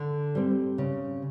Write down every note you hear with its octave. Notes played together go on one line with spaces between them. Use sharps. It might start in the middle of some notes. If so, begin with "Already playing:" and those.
Already playing: D3
G3 C4
C#3